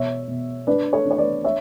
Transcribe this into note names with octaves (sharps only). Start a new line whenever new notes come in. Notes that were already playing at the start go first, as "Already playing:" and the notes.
Already playing: B2 E3 G#3 C#5 E5
B2
D4 B4 D5
A4 C#5
D4
C#5
B4 D5
C#5 E5